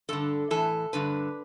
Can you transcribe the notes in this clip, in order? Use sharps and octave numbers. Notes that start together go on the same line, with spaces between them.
G2 D3 A4
A2 E3 A4
G2 D3 B4